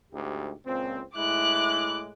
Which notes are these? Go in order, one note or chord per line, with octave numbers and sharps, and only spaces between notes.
D2 G#2 G4
C#2 A#2 C4
A2 G#3 E4 D6 F#6